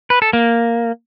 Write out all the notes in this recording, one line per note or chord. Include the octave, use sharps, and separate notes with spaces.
B4
A4
A#3